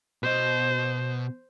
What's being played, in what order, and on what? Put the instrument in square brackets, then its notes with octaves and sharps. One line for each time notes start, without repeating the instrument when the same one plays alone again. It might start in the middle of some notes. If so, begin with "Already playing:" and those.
[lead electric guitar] B2 D#5 [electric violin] C5